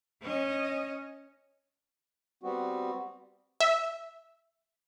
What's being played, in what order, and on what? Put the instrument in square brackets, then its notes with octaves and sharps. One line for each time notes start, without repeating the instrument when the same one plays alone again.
[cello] C#4 D#5
[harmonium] G3 B3 C4 F#4
[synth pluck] E5